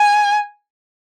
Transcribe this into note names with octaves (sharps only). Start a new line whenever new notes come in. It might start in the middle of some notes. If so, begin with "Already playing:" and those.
Already playing: G#5